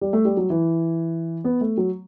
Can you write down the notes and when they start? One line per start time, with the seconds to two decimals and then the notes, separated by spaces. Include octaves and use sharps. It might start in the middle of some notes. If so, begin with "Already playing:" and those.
0.01 G3
0.13 A3
0.25 G3
0.37 F#3
0.50 E3
1.44 B3
1.61 A3
1.78 F#3